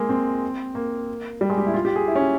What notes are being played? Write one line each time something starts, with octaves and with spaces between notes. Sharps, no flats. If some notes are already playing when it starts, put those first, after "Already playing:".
Already playing: G#3 A#3
C4
A#3
G3
G#3
G4
E4
F4
G4
G#4
E4
C#4